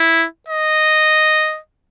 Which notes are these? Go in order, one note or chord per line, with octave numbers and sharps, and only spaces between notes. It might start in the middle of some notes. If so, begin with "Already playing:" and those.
Already playing: E4
D#5